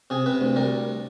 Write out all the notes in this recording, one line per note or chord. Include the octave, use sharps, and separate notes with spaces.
C3 G#4
C3 B4
D2
G3 A#4